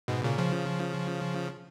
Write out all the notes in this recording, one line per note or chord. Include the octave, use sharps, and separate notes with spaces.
G#2 B2
A#2 C#3
C#3 F3